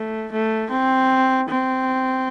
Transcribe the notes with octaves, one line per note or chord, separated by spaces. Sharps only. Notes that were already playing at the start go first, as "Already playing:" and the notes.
Already playing: A3
A3
C4
C4